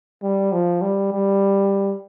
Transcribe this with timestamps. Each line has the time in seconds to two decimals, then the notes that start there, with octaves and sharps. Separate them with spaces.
0.22 G3
0.52 F3
0.82 G3
1.12 G3